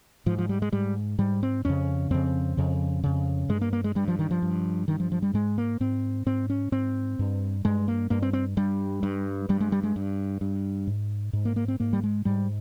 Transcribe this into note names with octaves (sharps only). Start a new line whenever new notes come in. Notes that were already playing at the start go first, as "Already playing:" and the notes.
G#2 F3
F3
G3
G#3
G#2 G3
G#2 G3
C4
F2 C#3 C#4
F2 C#3 C4
F2 C#3
F2 C#3
G2 G#3
A#3
A#3
G#3
G2 G3
F3
D#3
F3
G2
G2 D#3
F3
F3
G3
G#2 G#3
A#3
G#2 C4
G#2 C4
C#4
G#2 C4
G2
G2 G#3
A#3
G2 A#3
C4
C4
G2 G3
G2
G2 G3
G#3
G3
G#3
G2
G2
G#2
G#2
A#3
A#3
C4
G#2 A#3
G3
G#3
G#2 G3